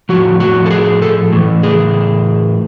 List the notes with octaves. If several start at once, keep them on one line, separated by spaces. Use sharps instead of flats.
A2 F3 F#4
F#4
A4
G#4
A4
A2 E3
G#4